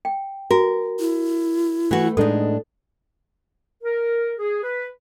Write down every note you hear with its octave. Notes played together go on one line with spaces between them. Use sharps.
G5
F#4 A#4
E4
E3 A3 F#4
A2 G#3 D4 D#4 A4
A#4
G#4
B4